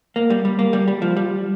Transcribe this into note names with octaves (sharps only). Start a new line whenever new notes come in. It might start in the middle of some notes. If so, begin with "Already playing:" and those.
A#3
G3
G3
A#3
G3
G3
F3
G3